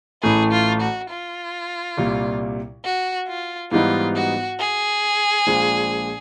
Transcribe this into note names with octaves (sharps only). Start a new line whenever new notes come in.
A1 A2 E3 A3 G#4
F4
F#4
F4
C2 A#2 G3
F#4
F4
G#2 E3 G3 B3 D#4 F4
F#4
G#4
A#1 A#2 F3 G#3